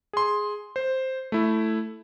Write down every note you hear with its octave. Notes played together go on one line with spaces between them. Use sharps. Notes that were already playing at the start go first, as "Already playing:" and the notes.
G#4 C6
C5
A3 E4